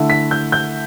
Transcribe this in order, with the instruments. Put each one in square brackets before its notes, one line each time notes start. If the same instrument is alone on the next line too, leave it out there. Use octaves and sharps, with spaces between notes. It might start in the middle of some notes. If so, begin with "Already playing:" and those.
Already playing: [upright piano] D3 A3 E4
B6
G6
G6